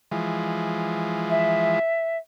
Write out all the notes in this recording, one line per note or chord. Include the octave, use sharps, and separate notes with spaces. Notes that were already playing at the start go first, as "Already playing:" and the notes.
E3 F3 G#3
E5